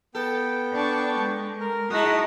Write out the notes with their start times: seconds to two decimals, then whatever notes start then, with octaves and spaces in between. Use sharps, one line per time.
0.15 B3 A4 G5
0.72 D4 A5 C#6
1.18 G#3
1.60 A#4
1.90 G#3 D#4 E4 F#4 A5 D#6